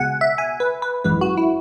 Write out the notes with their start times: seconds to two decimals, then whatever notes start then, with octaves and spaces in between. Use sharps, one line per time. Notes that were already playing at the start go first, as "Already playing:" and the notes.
Already playing: C#2 B2 G#3 F#5 G#5
0.21 E5
0.38 G#5
0.60 B4
0.82 B4
1.04 G#1 F#2 E3 G#3 B4
1.21 F#4
1.37 E4